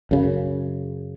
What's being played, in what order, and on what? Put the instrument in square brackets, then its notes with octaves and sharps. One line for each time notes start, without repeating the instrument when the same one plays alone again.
[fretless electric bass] F#2 C#3